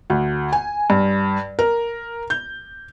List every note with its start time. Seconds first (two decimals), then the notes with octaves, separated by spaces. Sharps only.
0.10 D2
0.53 G#5
0.90 G2
1.59 A#4
2.30 G6